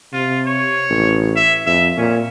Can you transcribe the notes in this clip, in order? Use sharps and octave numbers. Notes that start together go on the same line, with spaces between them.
C3 F4
C#5
A1
E5
F2 E5
A#2 C#4